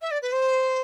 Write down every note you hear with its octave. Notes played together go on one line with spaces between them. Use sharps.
E5
D5
B4
C5